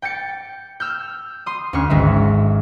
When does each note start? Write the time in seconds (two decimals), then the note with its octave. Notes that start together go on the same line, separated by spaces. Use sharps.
0.02 G5 G6 A6 C#7
0.80 E6 F6 G6
1.46 C6 D#6
1.73 D2 C#4 C#6 F6
1.89 G#1 G#3 E5